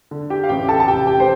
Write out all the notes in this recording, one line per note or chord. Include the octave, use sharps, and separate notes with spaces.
D3
G4 G5
F5
A1 G4 G5
A4 A5
A5
F1 G4 G5
G4 G5
C5